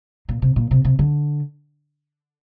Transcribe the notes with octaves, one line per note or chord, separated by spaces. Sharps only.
A#2
C3
A#2
C3
C3
D3